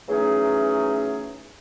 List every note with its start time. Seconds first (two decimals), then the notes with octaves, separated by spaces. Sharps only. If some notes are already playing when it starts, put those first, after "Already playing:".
0.09 E3 F#3 A3 C#4 D#4 G#4